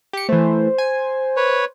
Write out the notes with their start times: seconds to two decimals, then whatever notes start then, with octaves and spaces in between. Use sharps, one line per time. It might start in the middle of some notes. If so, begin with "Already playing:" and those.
0.13 G4 C#7
0.29 E3 A3 C5
0.78 G#5
1.36 B4 C#5